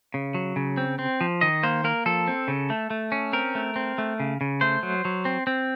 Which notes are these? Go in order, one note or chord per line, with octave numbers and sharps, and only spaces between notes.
C#3
F#3
C#3
C4
C4
F3
D#3 D#5
A#3 C5
A#3 A#4
F3 A4
C4
C#3
A3
A3
C#4
C4 A#4
A3
C4
A3
C#3
C#3
A3 C5
F#3
F#3
C4
C4